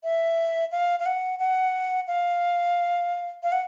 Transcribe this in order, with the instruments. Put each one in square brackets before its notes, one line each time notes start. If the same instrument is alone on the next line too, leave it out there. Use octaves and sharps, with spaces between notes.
[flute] E5
F5
F5
F#5
F#5
F5
F5
F#5